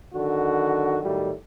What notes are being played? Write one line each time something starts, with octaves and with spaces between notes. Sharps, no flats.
D3 D#3 F#3 F#4
A2 D#3 F#3 G3